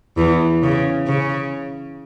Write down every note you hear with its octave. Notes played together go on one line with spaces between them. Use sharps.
E2 E3
C#3
C#3